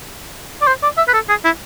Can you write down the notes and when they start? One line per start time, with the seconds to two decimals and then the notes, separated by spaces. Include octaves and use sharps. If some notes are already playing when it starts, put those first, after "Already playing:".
0.62 D5
0.67 C5
0.83 D5
0.98 E5
1.08 B4
1.14 A4
1.29 G#4
1.45 E4